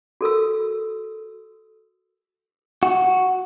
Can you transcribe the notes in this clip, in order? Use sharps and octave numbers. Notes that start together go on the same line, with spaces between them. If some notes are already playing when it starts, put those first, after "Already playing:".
F#4 A4 A#4 E6
F#4